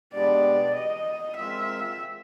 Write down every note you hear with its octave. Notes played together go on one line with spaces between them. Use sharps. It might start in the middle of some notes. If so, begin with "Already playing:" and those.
B2 G#3 B3 D4 G4 D5
D#5
G#3 C4 F4 A#4 E5